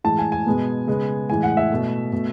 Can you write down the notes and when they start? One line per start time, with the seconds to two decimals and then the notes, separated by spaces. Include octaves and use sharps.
0.04 A2 E3 G#3 A5
0.19 G#5
0.32 G#5
0.46 B2 G#3 B3
0.87 C#3 G#3 B3
1.29 A2 E3 G#3 G#5
1.43 F#5
1.57 E5
1.71 B2 A3
2.12 B2 A3